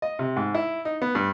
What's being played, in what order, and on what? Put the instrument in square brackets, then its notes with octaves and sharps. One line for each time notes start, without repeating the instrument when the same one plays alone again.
[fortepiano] D#5
C3
G#2
E4
D#4
B3
G2